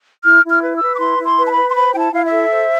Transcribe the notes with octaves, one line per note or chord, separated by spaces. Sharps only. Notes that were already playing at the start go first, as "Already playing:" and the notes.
E4 F6
E4
F6
B4
E6
B4
D6
E4 C6
E4
C6
B4
A5
B5
B4
C6
C5 B5
E4 G5
A5
E4 F5
E5
A4
C5